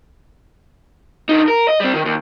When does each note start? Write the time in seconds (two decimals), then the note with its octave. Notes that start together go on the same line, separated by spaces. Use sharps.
1.29 D3 D#4
1.48 A#4
1.69 D#5
1.80 G3 C4
1.94 D#3
2.05 D#2